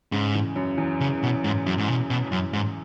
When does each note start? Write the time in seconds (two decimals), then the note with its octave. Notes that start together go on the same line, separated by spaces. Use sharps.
0.12 G#2 C#3
0.35 E2
0.56 F#2
0.78 E2
1.00 C#3
1.23 B2
1.44 G#2
1.66 F#2
1.78 G#2
1.88 B2
2.10 B2
2.32 F#2
2.53 G#2